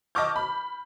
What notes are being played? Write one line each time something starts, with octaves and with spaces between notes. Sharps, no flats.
D#5 A5 C#6 D6 F6 G6
B5